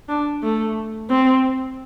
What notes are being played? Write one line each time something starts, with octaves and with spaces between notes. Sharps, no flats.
D4
A3
C4